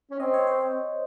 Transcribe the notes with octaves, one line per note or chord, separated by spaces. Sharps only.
C#4
C4 D#5
C#5
C5